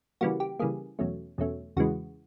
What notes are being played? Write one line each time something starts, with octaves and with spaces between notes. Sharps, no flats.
C#3 E3 G3 A#3 F#4
G4
C#3 E3 G3 A#3 G#4
E2 B2 F#3 A3 C#4
E2 B2 F#3 A3 C#4
E2 C#3 E3 G#3 F#4